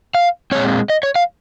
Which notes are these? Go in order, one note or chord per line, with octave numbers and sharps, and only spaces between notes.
F5
A#2 G#3 C4 C#5
D#5
C#5
F5